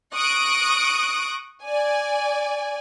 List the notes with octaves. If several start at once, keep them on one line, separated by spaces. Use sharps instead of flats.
C#6 D#6 F#6 A#6 D7
D5 G#5